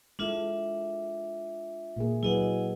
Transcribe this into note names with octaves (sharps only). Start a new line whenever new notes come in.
G#3 D4 E4 F4 A4 E5
A#2 A#3 G#4
F#3 E4 G#4 B4 D#5 F#5